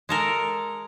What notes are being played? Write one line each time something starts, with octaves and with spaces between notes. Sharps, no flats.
G#3 A4 A#4